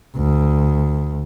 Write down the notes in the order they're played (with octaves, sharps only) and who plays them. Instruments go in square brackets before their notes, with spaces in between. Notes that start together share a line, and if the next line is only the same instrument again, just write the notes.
[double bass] D2